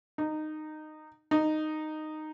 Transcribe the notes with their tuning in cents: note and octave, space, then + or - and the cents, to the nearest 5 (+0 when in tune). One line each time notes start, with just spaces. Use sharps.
D#4 -15
D#4 -10